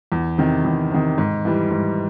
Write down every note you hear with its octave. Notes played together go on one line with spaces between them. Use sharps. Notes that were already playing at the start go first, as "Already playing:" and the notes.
E2
C3 D#3
E2
C3 D#3
G#2
E3 G3
G#2